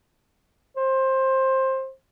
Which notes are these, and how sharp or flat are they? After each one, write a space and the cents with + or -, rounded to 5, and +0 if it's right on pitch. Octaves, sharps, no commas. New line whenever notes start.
C5 +15